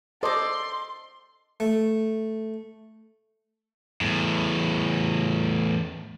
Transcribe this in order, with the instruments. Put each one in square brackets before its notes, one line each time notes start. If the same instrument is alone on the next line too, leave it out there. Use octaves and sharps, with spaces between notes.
[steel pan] A4 C5 D#5 [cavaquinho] D5 D6 [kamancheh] C6
[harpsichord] A3
[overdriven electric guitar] E2 A2